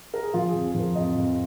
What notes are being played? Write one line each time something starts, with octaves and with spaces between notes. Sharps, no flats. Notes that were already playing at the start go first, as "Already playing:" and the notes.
A#4
G#4
F3 F4
F2 G#4
G#4
F3
A#4
F2 D#5
F2